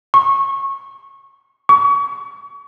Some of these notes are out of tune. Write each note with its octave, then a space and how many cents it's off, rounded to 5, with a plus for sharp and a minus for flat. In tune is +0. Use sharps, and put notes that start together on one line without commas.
C#6 -25
C#6 +35